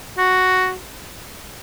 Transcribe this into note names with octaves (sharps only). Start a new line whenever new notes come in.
F#4